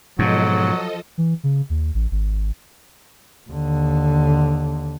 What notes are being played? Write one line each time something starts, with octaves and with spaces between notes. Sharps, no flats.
G#2 B2 F3 F#3 A4 D#5
E3
C#3
D#2
A1
G#1
D#2 D3